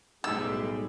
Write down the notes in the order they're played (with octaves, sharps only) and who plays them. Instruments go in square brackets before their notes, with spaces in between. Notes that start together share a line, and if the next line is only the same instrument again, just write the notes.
[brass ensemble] B1 G#3 D#4 [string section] A2 G3 [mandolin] E6